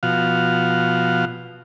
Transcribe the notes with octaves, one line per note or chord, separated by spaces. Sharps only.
B2 F3 F#4 F5